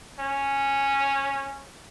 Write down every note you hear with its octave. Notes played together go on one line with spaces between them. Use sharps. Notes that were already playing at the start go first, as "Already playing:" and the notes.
C#4